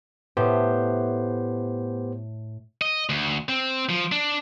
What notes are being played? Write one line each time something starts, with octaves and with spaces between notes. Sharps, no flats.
A2 B3 G4 C5
D#5
D2
C4
F3
D4